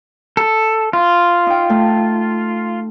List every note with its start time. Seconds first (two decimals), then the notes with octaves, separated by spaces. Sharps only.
0.37 A4
0.93 F4
1.47 D#4 G5
1.70 A3